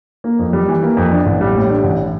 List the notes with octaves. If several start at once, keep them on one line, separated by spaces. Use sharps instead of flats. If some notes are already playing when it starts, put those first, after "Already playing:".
A#3
F2
G3
E3
A#3
F2
D4
A1
G3
A2
D4
A1